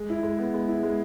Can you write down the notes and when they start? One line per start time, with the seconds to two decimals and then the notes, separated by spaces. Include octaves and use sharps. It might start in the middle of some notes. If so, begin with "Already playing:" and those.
Already playing: G#3
0.10 E4
0.23 G#3
0.39 B3
0.53 G#3
0.68 E4
0.83 G#3